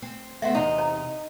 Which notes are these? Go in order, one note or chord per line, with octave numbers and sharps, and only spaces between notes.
C4
A3 B3 C4 E5 F#5
E2 C3 D#4
C5 A#5